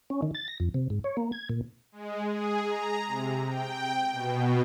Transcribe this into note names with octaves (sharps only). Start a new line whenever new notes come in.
C#4
D#3
A6
A#6
F2
C3
G#2
C#5
A#3
G#6
A#2
G#3
G#4
A#5
C3
G5
B2